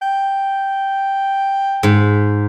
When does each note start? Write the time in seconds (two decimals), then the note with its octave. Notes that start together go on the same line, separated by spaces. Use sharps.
0.02 G5
1.83 G#2